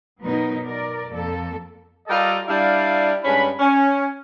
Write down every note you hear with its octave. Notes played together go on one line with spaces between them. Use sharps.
B2 F#3 B3 D#4 A#4
A#4 D5
F2 A#3 A4
G3 F4 G4 A4 A#4 D#5
G3 D4 E4 D5 F5
G2 G#3 C#4 B5
C#4